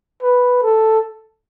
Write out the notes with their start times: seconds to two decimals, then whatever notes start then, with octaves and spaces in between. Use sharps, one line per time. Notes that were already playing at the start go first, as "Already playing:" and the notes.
0.22 B4
0.63 A4